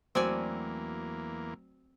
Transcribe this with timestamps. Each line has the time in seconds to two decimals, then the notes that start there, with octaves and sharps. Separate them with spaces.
0.15 E2 F#3 A3 A#3 C4 F#4 D5 G#5